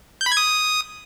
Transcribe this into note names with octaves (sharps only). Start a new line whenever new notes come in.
G6
B5
G#6
D#6